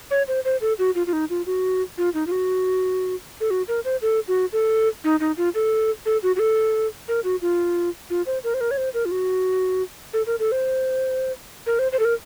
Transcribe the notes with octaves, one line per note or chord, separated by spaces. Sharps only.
C#5
C5
C5
A4
F#4
F4
F4
D#4
F4
F#4
F4
D#4
F4
F#4
A4
F#4
A#4
C5
A4
F#4
A4
D#4
D#4
F4
A4
A4
F#4
F#4
A4
A#4
F#4
F4
F4
C5
A#4
C5
A#4
C#5
C5
A#4
F4
F#4
A4
A#4
A4
C5
A#4
C5
C5
A4
A#4